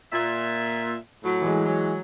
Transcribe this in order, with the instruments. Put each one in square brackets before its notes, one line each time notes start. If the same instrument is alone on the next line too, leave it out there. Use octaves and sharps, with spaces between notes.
[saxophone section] A#2 E5
A2 F#3
[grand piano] E3 G#3
[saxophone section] F#3